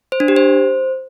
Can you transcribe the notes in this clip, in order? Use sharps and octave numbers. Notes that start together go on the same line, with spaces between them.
C5
D4
G4
C5